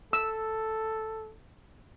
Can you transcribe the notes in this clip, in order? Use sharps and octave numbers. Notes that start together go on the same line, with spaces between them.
A4 E6